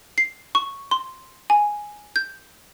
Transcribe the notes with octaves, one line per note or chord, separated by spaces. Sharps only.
C7
C#6
C6
G#5
G6